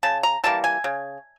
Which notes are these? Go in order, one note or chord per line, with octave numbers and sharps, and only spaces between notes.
C#3 A5
A#5
E3 G3 A#3 A5
G#5
C#3